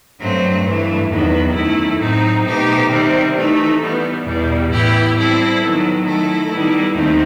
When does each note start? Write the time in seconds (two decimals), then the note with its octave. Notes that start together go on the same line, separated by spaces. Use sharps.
0.19 G2 F#3 A3 C4
0.63 G2 E3 A3
1.10 E2 C3 D#3 F#3 B3
1.54 F#2 D#3 A3 E4
1.99 A2 F#3 C4 D#4
2.44 B2 A3 D#4 G4 C5
2.89 C3 D#3 G3 C4
3.34 E3 A3 D#4
3.79 E3 G3 B3
4.24 E2 B2 G3
4.69 A2 E3 B3 E4 G4
5.15 G3 C4 E4 A4
5.59 D#3 F#3 B3
6.04 D#3 A3 E4 A4
6.50 D#3 G3 B3 E4
6.94 D#2 D#3 A3 C4